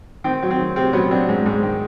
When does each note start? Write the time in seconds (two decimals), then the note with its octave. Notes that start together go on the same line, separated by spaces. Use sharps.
0.24 D#3 C4
0.43 F#3
0.51 C4
0.59 D#3
0.76 C3 C4
0.93 F#3 B3 C#4
1.11 F#3 C4 D4
1.29 G#2
1.46 G#2
1.63 D#3